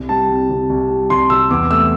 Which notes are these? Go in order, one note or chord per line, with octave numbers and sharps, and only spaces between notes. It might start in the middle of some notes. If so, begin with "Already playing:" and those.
Already playing: C2
G3 A5
C2
C3
C2
G3
C2 C6
C3 E6
E2 D6
A3 E6